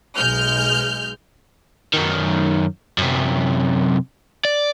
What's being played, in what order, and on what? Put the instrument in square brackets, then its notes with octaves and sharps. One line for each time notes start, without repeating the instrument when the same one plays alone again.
[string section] B1 G#3 F6 G6
[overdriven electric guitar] F#2 D#3
F#2 C3
D5